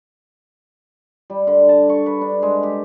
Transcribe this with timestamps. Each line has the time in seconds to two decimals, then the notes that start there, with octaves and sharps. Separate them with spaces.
1.30 G3
1.47 D3
1.69 A5
1.89 C#6
2.06 B4
2.21 D4
2.42 G#3
2.63 G4